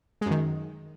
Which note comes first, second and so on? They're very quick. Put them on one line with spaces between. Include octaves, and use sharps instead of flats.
G#3 F#2 D#3